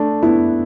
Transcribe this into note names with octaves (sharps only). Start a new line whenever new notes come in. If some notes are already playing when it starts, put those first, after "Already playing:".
Already playing: A3 D4
B3 E4